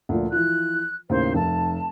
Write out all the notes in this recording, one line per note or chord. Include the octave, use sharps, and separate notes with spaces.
D2 A#2 F3
E3 F3 F4 F#6
D#2 A2 C#3 C5
F1 A5